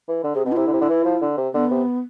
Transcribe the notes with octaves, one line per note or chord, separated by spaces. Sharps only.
E3
D3
C3 G#4
B2 C4
F4
C3 E4
D3
C3
D3
E3
F3
D3
C3
D3 B3
C3